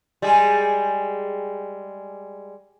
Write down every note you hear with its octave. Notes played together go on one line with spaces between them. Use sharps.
G3 G#3 G#4